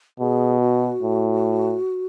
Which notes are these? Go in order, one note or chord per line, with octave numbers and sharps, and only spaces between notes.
B2 G#4
F#4
A2